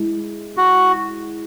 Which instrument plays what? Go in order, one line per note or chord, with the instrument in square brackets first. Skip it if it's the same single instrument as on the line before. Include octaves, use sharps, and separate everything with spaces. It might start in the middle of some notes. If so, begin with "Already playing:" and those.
Already playing: [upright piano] G#3 E4
[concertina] F#4